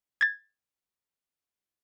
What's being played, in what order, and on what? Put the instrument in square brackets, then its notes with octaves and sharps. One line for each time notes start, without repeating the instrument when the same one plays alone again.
[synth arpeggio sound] G#6 A6